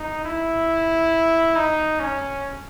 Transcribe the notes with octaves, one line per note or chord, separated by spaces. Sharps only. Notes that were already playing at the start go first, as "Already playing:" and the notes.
Already playing: D#4
E4
D#4
C#4